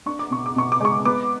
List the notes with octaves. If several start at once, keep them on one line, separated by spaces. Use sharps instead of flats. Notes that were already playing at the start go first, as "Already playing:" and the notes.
D4 C#6
D6
B2 C#6
D6
B2 C#6
D6
G#3 C#6
B3 D6